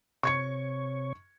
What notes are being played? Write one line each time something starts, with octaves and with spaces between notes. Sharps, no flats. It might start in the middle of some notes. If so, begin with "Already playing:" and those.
C3 C#5 C#6 G#6 C#7